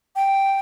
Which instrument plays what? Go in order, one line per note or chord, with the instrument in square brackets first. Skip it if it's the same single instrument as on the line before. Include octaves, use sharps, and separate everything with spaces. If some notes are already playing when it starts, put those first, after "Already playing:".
[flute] G5